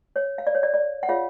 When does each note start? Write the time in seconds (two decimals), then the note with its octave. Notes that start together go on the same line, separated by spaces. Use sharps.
0.16 C#5
0.38 F5
0.47 D5
0.55 C#5
0.63 D5
0.74 D5
1.03 F#5
1.09 F4 G#4 C#5 F5